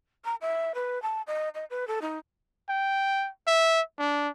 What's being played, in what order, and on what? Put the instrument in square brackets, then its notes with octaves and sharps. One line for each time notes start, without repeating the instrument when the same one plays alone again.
[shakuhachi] A#5
E5
B4
A5
D#5
D#5
B4
A4
D#4
[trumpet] G5
E5
D4